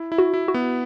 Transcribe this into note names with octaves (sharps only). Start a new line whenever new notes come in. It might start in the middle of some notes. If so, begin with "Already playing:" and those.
Already playing: E4
E4
F#4
E4
F#4
B3